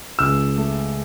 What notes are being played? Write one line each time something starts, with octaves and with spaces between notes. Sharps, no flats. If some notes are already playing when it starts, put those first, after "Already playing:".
C#2 E6
A3